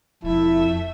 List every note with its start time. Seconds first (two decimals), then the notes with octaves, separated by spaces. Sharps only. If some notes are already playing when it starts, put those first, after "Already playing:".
0.23 E1 F2 A3 E4 E5